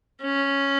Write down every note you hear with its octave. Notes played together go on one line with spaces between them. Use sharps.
C#4